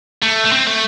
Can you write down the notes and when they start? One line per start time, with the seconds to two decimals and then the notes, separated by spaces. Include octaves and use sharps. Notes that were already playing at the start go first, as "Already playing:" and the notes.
0.23 A3
0.46 A3
0.52 C4
0.67 A3